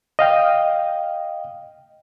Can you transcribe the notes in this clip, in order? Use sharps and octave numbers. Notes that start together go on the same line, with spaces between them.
D#5 F5 G5